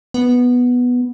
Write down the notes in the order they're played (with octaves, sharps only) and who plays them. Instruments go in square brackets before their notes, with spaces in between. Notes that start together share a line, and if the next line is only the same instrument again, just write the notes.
[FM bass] B3